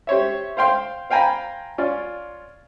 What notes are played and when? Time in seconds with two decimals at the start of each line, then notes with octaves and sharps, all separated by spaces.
0.07 G4 C5 C#5 E5
0.57 C5 F5 G5 C6
1.10 C5 F5 G5 G#5 A#5 B5
1.78 C#4 F4 D5